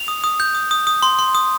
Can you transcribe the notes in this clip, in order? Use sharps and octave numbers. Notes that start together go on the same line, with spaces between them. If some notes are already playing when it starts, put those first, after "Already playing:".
Already playing: F7
D#6
D#6
G6
D#6
D#6
D#6
C6
C6
D#6